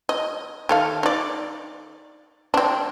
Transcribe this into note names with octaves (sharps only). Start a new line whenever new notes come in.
D#5
D#3 A4 F5
D#4 D5
C4 D4